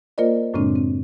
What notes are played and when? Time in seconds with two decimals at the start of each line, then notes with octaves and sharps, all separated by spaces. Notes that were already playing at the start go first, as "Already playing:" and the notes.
0.18 A#3 F4 A#4 C5 D5 D#5
0.54 F#2 A2 C#3 G#3 C4 D4
0.76 C4